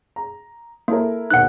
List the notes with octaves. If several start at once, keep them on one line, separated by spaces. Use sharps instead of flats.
A#5
A#3 E4 A4 A#4
D#2 B2 D#3 F#5 F#6